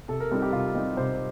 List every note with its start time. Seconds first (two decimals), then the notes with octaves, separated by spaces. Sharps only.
0.08 C3 A4
0.20 A#4
0.31 G3 C4 D#4 A4
0.42 G4
0.53 C3 F4
0.75 G3 C4 D#4
0.97 C3 C5